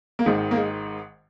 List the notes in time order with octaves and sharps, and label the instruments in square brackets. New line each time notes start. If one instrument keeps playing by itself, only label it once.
[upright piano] A#3
G#1 G#2 D#3 G#3
A#3
G#3